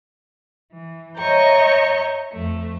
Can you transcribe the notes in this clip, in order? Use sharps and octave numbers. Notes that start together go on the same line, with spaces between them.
E3
C#5 D#5 E5 A#5 C#6 G6
F2 A3